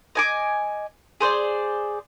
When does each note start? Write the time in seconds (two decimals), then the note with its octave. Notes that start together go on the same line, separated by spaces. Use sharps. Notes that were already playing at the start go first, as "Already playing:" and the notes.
0.15 D#5 G#5 D6
1.20 G#4 C5 D5